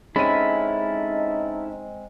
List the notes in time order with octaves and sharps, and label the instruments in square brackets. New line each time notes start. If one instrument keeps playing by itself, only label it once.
[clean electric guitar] G#3 C4 [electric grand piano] C#4 D#7 [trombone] D#4 [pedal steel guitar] E4 A4 B5